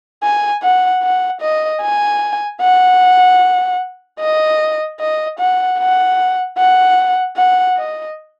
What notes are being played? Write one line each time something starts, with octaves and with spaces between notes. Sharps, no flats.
G#5
F#5
F#5
D#5
G#5
F#5
D#5
D#5
F#5
F#5
F#5
F#5
D#5